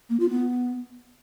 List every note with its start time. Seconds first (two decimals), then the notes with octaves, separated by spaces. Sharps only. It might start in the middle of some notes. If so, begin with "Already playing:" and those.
0.10 A#3
0.20 F4
0.30 B3